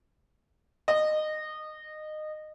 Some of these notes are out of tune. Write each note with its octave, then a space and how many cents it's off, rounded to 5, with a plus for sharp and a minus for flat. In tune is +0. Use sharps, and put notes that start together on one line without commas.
D#5 -20